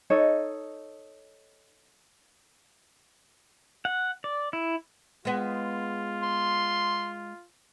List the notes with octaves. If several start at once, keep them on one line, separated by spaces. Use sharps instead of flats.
D#4 A4 C#5 D#5
F#5
D5
E4
G#3 B3 F4
C6